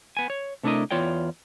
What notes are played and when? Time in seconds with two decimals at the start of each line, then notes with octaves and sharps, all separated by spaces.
0.17 B3 G#5
0.30 C#5
0.63 C3 A3 D4 E4 A#4 D#5
0.91 E2 F4 C#5 D5 G5